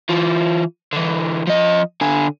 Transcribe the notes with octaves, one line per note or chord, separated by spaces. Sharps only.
E3 F4
D3 E3
F3 D#5
D3 G#5